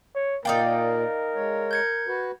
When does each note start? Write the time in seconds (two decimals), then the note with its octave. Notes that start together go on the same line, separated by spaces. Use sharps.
0.15 C#5
0.45 A#2 A#3 D#4 A#4 D5 F5 G5
1.35 G#3 C#5
1.71 G6 G#6 C#7
2.08 F#4 B4